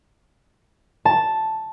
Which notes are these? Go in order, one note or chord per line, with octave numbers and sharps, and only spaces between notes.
A5